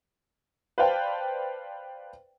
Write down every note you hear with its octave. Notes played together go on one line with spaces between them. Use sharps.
B4 C5 D5 F5 G5 A5